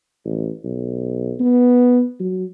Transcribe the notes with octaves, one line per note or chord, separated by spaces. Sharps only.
A1
B1
B3
F#3